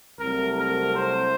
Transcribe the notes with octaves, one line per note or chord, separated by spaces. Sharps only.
C2 C3 F#3 A3 A#4
A#4
C5